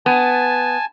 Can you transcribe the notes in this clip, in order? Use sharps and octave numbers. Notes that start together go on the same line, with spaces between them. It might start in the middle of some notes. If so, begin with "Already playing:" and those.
B3 G#5 A5